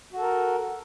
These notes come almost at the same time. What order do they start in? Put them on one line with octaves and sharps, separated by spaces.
F#4 A4 A#4